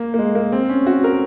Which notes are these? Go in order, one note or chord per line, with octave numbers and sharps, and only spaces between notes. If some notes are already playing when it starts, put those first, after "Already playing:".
Already playing: A#3
A#3
G#3
A#3
C4
C#4
F#4
A#4